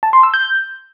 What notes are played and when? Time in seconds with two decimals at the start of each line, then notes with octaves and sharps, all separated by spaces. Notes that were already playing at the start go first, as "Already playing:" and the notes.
0.03 A5
0.13 C6
0.23 E6
0.34 G6